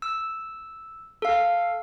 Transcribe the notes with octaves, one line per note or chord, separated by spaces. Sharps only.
E6
A4 F5